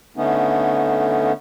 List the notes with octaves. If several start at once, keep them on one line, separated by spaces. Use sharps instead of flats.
D3 A3 B3 C#4 D#4